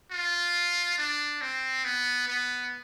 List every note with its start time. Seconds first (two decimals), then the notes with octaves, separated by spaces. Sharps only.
0.11 F4
0.98 D4
1.41 C4
1.85 B3
2.28 B3